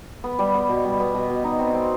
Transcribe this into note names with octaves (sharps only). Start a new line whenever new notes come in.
B3
G3
B3
B2
G3
B3
B2
B2
D#4
C4
C4